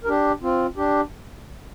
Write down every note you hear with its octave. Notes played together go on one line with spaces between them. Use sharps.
A#4
D4 G4
C4 F4
D4 G4